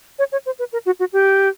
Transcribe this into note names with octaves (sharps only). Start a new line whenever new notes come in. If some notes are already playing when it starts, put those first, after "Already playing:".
C#5
C#5
C5
B4
A#4
F#4
F#4
G4